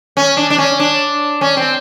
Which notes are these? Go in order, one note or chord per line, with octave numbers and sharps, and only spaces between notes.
C#4
D4
D4
C#4
D4
C#4
C4